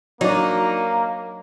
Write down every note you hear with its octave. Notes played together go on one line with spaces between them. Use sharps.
F#3 A#3 D4 D#4